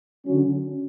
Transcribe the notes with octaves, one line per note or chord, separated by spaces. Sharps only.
D3 F#3 C#4